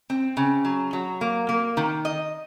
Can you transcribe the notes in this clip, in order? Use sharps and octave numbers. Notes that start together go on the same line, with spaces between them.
C4
C#3
F#3
F#3
A#3
A#3
D#3
D#5